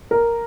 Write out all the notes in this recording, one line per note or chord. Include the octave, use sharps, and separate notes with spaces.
A#4